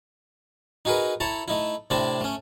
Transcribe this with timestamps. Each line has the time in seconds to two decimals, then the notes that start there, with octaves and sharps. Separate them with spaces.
0.85 D#4 F#4 G#4 A#4 B4
1.20 E4 A4 C#5 A5 A#5
1.48 A3 D#4 E4
1.90 A2 C3 C4 D4 E4 A5
2.21 A3 C#4